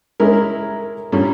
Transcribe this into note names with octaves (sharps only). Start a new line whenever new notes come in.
G#3 C#4 E4 A#4
A#2 G3 C#4